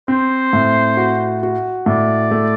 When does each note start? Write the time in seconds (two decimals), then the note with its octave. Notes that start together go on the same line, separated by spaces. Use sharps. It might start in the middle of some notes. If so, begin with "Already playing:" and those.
0.08 C4 C5
0.53 A2
0.97 F#4
1.43 F#4
1.86 A2 D5
2.31 A3